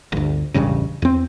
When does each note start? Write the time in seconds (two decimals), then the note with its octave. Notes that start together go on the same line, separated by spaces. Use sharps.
0.12 G1 D2
0.54 E1 A1 G2 C#3
1.02 E2 C4